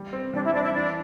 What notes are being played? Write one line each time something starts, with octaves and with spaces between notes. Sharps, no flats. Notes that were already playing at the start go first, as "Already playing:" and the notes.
Already playing: G3
C4
G3 D4
E4
C4 D4
E4
E3 D4